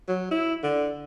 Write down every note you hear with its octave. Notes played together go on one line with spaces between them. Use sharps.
F#3
E4
D3